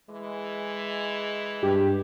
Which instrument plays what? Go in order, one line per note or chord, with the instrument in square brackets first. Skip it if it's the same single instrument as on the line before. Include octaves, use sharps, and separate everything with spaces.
[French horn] E3 [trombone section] G#3
[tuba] G2 [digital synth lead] G4